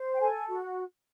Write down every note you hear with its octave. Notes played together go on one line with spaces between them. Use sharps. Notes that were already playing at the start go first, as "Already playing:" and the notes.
Already playing: C5
G5
A4 G#5
F#4